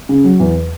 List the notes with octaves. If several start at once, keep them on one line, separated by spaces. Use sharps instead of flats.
C#3
F#3
E2